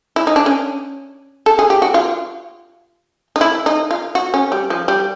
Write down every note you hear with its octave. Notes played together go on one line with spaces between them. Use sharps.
E4
D#4
D4
C#4
A4
G#4
G4
F#4
F4
D#4
E4
D#4
F4
F#4
C#4
G3
F3
G3